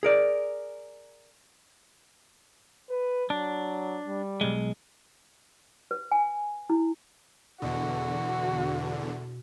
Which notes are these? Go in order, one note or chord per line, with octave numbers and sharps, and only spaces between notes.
G#4 A#4 D5
B4
F#3 D4
G3
B1 G#3
B4
G#5
E4
E2 B2 D3 F#4